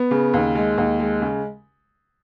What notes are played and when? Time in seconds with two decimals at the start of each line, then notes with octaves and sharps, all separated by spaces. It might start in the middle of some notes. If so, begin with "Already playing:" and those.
Already playing: B3
0.11 C#3
0.34 D#2
0.55 G#3
0.78 D#2
1.00 G#3
1.22 C#3